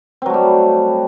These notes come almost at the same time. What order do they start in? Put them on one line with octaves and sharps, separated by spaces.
C4 F#3 A3 G3